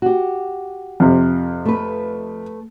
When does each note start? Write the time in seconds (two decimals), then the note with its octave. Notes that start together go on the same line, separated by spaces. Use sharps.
0.02 F#4 G4
1.00 F2 C3
1.65 A3 B4